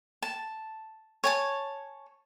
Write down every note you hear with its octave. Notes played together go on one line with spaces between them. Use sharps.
A5
C#5 G#5 A5